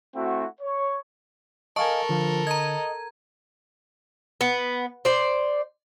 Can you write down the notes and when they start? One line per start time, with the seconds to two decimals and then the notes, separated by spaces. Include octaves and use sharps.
0.15 A3 C4 E4 F#4
0.61 C#5
1.76 A4 A#4 D#5 F5 G#5 A5 C#6
2.09 D3 F3
2.47 D#5 A#5 G#6
4.41 B3
5.05 C5 D5